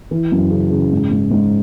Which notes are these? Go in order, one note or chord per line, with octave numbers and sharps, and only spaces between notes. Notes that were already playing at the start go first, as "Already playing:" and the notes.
E3
F#2
C#3
C#3
G#2
G#2
G#2